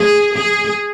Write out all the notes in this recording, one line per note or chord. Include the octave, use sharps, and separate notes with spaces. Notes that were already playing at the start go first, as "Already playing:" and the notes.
Already playing: G#4
G#4